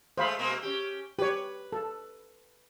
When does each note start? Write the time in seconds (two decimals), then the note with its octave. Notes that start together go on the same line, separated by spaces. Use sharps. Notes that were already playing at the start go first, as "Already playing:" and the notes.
0.18 G#3 A3 C5 F5 B5
0.39 B2 G#3 A#3
0.62 C#4 G4
1.19 G4 B4 C#5
1.72 A4